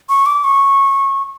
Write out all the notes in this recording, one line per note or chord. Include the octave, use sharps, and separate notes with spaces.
C#6
D6
C#6